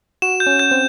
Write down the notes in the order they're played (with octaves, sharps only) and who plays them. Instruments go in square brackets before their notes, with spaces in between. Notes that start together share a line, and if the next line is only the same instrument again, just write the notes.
[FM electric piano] F#4 [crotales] E7
[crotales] G6
[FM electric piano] C#4
[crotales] G6
[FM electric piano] C4